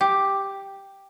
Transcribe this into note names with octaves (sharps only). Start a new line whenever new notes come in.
G4